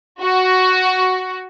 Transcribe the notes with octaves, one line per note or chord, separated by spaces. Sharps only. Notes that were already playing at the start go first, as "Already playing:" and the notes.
F#4